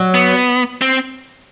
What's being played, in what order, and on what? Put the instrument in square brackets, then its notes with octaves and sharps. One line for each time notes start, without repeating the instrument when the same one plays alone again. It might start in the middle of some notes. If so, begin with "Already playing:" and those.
Already playing: [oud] F#3
[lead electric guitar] B3
C4